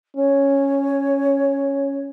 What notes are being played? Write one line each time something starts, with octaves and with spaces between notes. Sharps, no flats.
C#4 C#5